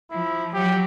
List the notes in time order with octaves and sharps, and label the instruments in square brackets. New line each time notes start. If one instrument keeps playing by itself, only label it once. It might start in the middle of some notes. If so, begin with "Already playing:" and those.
[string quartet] F3 [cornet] E4
[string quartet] F#3 [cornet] G4